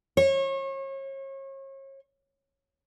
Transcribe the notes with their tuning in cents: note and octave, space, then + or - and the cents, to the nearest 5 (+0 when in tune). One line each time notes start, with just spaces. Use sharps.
C#5 -35